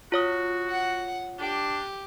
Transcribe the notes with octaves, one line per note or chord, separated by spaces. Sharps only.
F4 F#4 C#5 D#6
F#5
D4 G4